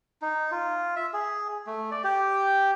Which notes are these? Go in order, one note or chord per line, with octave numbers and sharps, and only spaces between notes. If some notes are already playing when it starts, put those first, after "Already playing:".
D#4
F4
E5
G#4
A3
D5
G4